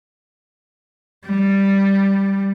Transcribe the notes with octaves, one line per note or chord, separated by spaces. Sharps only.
G3